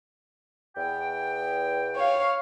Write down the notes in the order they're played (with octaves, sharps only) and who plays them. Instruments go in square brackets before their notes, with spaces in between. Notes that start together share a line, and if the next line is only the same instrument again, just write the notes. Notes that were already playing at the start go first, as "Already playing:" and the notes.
[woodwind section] E2 G5
[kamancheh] C#5 F5